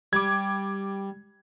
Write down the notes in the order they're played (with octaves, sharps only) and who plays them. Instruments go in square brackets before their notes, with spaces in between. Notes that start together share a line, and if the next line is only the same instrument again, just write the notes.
[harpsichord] G3 [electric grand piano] D6 G#6